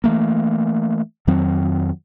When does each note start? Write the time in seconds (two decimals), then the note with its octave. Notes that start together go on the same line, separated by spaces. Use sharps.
0.04 E3 A3 A#3
1.27 F2 D#3 F#3 C4